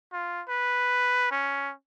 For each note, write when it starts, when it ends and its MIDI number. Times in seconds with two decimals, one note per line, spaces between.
0.13 0.42 65
0.49 1.31 71
1.31 1.73 61